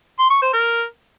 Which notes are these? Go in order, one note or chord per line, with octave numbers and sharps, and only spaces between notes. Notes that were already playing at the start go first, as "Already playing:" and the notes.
C6
C#6
C5
A#4